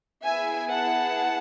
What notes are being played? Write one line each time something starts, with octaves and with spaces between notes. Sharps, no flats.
B3 E4 G#4 E5 G#5
F#5 A5